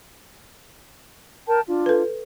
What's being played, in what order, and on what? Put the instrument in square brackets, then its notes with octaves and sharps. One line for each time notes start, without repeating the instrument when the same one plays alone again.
[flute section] A#4 G5 A5
D4 F4
[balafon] A4 B4